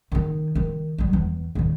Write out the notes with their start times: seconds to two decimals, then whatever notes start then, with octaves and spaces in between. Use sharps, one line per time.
0.12 D#3 D#4
0.55 D#3
0.98 F#3 G3
1.13 E2
1.55 D#2 A#2